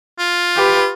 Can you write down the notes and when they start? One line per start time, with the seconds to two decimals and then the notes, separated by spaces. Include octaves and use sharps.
0.19 F4
0.56 G4 B4